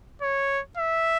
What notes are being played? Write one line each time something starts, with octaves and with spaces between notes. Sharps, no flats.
C#5
E5